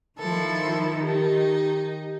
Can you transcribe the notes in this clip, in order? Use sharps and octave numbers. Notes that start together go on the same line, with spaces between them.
D#3 F3 E4 A4
D#4 G4